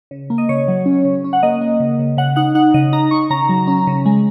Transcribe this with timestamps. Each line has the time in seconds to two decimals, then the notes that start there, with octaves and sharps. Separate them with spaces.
0.11 C#3
0.30 A#3
0.38 D#5
0.49 C#3 C#5
0.68 F#3
0.86 C#4
1.05 C#3
1.24 C#4
1.33 F#5
1.43 A#3 D#5
1.61 A#3
1.80 C#3
1.99 C#3
2.17 C#3 F#5
2.36 D#4 F#5
2.55 D#4 F#5
2.74 C#3 D#5
2.93 D#4 A#5
3.11 D#4 C#6
3.30 C#3 A#5
3.49 F#3
3.67 C#4
3.87 C#3
4.06 G#3